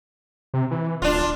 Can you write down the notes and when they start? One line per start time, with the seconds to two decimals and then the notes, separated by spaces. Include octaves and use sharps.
0.54 C3
0.71 E3
1.02 D1 D4 F4